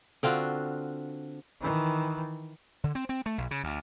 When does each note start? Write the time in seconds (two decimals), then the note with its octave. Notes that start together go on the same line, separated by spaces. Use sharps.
0.23 D3 C4 F4 F#4
1.61 D#3 E3
2.84 D3
2.95 C4
3.09 C4
3.26 A3
3.38 B1
3.51 C#3
3.64 D2